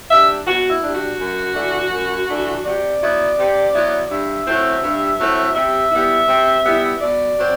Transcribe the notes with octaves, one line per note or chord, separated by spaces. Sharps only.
G3 D4 E5
B2 F#4
E4
G3 D4
F#4
F#2
E3 A3 D4
F#2
E3 A3 D4
C3 D5
F#3 B3 E4
C3
F#3 B3 E4
G2 E5
F#3 A3 C4 E4
G2
F#3 A3 C4 E4
C3 E5
G3 B3 E4
C3
G3 B3 E4
B2 D5
F#3 C4